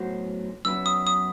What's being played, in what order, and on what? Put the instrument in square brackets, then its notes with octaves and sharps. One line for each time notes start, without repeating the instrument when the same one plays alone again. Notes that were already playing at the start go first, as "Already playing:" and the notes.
Already playing: [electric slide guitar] A2 F#3 B3 F#4 C5
[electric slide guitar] F#2 F#3 B3 E4 B4 [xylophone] E6
[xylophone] D#6
D#6